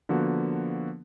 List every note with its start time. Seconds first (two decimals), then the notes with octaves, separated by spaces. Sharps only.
0.09 D3 F3 A#3 B3 F#4